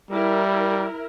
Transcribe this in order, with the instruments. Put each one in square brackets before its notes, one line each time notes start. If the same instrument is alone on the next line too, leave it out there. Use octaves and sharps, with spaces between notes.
[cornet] G3 [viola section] E4 A#4